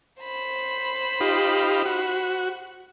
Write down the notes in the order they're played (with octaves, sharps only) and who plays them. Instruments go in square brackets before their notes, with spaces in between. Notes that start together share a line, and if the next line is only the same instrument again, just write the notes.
[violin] C5 B5
[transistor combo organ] D#4 F4 G4
F#4